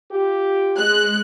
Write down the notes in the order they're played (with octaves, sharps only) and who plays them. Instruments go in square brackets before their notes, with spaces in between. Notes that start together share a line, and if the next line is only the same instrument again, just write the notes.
[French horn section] F4 G4
[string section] G#3 F#6